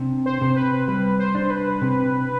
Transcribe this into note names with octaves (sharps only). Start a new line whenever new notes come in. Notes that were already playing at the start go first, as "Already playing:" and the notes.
Already playing: C3 D4
C5
C3
B4
G3 B4
C5
D4
B4
C3